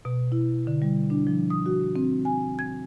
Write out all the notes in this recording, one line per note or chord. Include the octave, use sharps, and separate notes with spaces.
B2
E4
D3
G3
D4
F3
D#6
F#4
C4
G#5
G#6